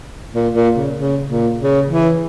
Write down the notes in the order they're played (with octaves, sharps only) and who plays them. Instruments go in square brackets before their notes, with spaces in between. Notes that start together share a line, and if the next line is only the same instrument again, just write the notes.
[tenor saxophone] A#2
A#2
C#3
C#3
A#2
C#3
E3